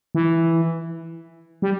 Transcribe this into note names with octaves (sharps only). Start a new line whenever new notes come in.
E3
G3